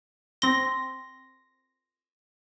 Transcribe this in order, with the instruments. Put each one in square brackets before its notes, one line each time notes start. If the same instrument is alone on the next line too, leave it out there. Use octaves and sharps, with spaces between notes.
[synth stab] C4 A#6 [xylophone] C6 G7